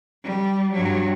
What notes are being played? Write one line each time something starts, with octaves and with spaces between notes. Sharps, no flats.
G3
G2 F#3